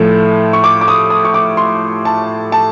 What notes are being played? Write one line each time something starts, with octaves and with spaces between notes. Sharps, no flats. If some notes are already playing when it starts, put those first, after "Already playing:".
Already playing: A2 F3 A3
C#6
D6
D6
D#6
D#6
C#6
D6
C6
A5
A5